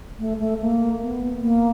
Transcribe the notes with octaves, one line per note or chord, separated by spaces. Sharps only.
A3
A3
A#3
B3
A#3